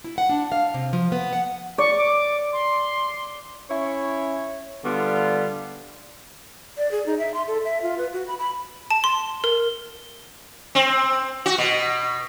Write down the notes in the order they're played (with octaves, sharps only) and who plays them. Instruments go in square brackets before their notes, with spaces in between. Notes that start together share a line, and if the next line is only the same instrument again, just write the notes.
[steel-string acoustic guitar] E4
F#5
D4
F5
C3
F3
B3
F#5
[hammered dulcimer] D5 [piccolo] C#6
[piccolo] D6
C6
[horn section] C#4 E4 C#5
D3 G3 B3 F4
[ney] D5
G#4
D#4
E5
C6
A4
E5
F4
B4
F#4
B5
B5
[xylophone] A5
C6
A#4
[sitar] C4
F#4
B2